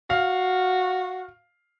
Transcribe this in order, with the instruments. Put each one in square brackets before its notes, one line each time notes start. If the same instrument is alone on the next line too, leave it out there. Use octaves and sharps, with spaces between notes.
[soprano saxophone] F#4 [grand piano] F5